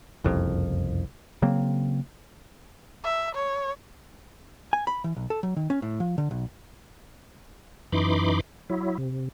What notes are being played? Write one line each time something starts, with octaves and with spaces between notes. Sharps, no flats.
F#1 C2 F2
C#3 F#3 A#3 C4
E5
C#5
G#5
B5
E3
B1
A4
F#3
D#3
C#4
A2
F3
D3
B1
F#2 E3 D#4 B5 C6 D6
F#3 E4
C3